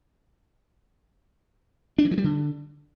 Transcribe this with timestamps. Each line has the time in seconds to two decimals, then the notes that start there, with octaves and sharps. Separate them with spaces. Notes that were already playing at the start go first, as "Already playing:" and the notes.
1.98 D4
2.05 E3
2.11 F3
2.18 G3
2.24 D3